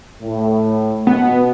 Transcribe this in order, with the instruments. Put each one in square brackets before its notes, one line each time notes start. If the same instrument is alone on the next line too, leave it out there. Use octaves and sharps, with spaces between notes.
[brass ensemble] A2
[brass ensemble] B2 [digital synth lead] B3